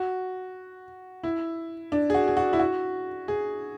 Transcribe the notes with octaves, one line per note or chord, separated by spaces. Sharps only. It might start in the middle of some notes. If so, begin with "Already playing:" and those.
Already playing: F#4
E4
D4
G#4
F#4
G#4
F#4
E4
F#4
G#4